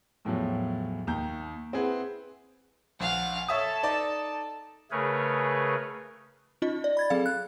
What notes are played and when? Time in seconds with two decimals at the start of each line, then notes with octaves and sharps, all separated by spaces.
0.25 E2 A2 F3 F#3
1.07 D#2 A#5 G6
1.73 C4 E4 G#4 B4 F#5
3.00 A#1 F5 F#5
3.49 A4 C#5 E5 A5 D#6
3.83 D#4 D5
4.91 C#3 A3 G#4 A#4 B4 C#5
6.62 C#4 D#4 F4 D#5
6.84 D5
6.97 B5 G#6 A6
7.10 F#3 C4 G#4 A4 F5
7.26 F#6